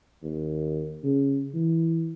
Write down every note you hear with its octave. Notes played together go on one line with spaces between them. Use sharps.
D#2
C#3
E3